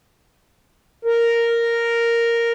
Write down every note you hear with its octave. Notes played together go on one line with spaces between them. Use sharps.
A#4